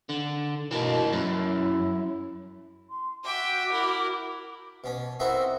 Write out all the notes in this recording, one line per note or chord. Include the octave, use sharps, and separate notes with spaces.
D3
B2 E3 A#3
F#2 E4
C6
F#4 E5 G5 D6
E4 A#4
B2 C#4
C4 D#4 E4 F#4 A#4